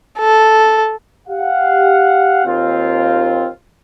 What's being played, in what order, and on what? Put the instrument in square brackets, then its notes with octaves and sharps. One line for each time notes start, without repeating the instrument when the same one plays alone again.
[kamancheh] A4
[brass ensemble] G4 F5 F#5
D#2 C4 F4